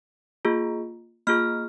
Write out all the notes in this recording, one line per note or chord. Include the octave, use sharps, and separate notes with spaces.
A#3 F4 G#4
A#3 F4 G#4 F6